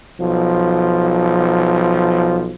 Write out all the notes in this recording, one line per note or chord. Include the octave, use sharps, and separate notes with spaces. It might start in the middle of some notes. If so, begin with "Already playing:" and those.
B1 F3